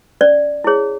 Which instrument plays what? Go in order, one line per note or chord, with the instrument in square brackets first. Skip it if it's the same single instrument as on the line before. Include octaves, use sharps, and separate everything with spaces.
[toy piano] C#4 D5
E4 G#4 C#5